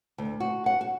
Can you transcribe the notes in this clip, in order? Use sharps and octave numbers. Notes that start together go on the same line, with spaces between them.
D2
F#4
F#5
F#4